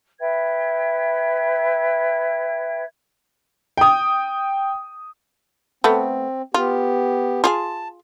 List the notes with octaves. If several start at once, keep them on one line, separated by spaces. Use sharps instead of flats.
B4 E5 G5 G#6
G5 D#6
A3 B3 C4
B3 F4 G4
F4 G4 G#4 A5